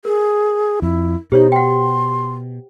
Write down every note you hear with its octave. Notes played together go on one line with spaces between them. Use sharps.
G#4 A#4
F2 E4
B2 D#4 G4 C5 C#5
F#5 G5 C6